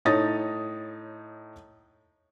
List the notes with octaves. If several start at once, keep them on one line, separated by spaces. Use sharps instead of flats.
A2 D#4 C#5 D#6 A6 A#6